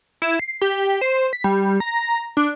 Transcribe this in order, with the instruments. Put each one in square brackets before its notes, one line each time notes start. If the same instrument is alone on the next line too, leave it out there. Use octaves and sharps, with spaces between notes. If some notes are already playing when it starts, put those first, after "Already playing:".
[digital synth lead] E4
C7
G4
C5
B6
G3
A#5
D4